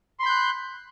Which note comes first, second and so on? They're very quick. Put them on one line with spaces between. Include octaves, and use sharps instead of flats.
C6 B5 G6 F#6